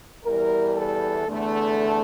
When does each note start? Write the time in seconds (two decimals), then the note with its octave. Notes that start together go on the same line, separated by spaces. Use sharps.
0.24 E2 E3 G3 A#4
0.75 A4
1.26 E2 D3 A3